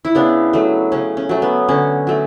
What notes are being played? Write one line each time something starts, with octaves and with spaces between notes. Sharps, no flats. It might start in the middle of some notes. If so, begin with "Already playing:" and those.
E4
C#3 B3 D4
F#3 A3
C#3 C#4
C#4
F#3 A3
B3
D3 C#4
F#3 A3